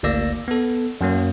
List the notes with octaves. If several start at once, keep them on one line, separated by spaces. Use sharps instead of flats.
G#1 D2 A#3 D5 E6 A#6
B3 A4
F#2 F#3 A#3